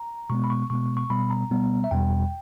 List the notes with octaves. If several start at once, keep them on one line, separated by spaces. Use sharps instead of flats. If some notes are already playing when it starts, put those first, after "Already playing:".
Already playing: A#5
B2 G#3 B3 C#6
B5
C#6
B2 G#3 B3 C#6
C#6
B2 G3 B3 B5
A#5
B2 G3 B3
E5
E2 B2 G3 G5